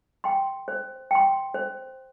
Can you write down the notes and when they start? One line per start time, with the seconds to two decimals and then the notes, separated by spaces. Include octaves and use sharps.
0.24 G5 C6
0.68 C5
1.11 G5 C6
1.54 C5